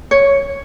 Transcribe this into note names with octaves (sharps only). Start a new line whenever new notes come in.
C#5